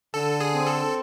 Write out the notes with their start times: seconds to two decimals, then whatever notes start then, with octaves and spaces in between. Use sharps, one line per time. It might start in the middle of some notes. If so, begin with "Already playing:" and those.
0.14 D3 A4
0.40 G#4
0.54 C4
0.67 A4